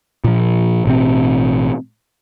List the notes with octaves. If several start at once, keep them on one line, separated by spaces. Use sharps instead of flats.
A#2 F3
A1 B2 C4